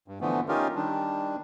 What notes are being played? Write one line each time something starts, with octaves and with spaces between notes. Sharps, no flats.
G2
D3 E3 F3 A3 B3
C#4 D#4 F4 G4 A#4
D#3 G3 D4